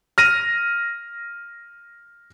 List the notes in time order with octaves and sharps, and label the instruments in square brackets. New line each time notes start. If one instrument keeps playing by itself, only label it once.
[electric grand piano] F6 A#6 D#7